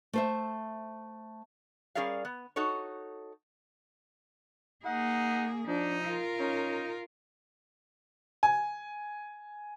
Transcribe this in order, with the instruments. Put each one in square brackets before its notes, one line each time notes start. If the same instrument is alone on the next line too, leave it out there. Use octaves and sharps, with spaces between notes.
[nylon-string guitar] A3 C5 E5
[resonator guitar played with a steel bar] G3 C#4 G#4 A#4 D5 F5
B3
D#4 F#4 A4 C#5
[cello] A#3 G#4 [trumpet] D#4 [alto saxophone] F#5
[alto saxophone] F3 [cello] D4 [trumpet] D#4
[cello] F4 A#4
[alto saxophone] C#4 [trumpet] D#4
[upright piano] G#5